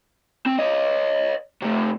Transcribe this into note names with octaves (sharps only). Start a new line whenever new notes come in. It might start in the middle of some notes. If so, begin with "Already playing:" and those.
C4
C#5 D#5
C3 A3